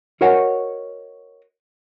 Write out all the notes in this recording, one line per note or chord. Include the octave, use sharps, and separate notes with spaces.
F#4 A#4 C#5 D#5 F#5